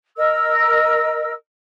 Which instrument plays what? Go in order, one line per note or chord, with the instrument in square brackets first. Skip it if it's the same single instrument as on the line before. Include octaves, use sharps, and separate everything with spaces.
[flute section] A#4 D#5 E6